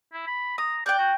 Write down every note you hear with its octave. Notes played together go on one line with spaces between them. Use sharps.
E4
B5
A#5 D#6
D5 G5 F#6 G6
F#4